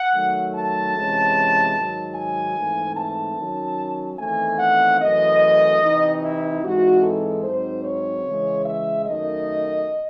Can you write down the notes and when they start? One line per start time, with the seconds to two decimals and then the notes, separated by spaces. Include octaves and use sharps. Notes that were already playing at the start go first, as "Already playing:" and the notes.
Already playing: F#5
0.13 D#3 F#3 A3
0.54 A5
0.94 C3 E3 G#3 C#4
1.76 G#2 D#3 F#3
2.16 G#5
2.57 G#2 E3 A3 C4
2.97 A5
3.38 D#3 F#3 C#4
4.19 E2 D#3 A3 C4 G#5
4.60 F#5
5.00 F#2 E3 A3 D#5
5.81 C3 E3 C4 D#4
6.22 E4
6.62 G#2 E3 G#3 C4 D#4 F#4
7.03 A4
7.44 G#2 F#3 C4 D#4 C5
7.84 C#5
8.24 C#3 E3 G#3
8.66 E5
9.06 F#2 D#3 A3 D#5